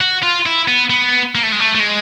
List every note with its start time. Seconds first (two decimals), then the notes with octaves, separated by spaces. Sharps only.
0.01 F#4
0.23 F4
0.46 E4
0.68 B3
0.90 B3
1.35 A#3
1.43 A3
1.52 G#3
1.59 A3
1.75 A3
1.80 G#3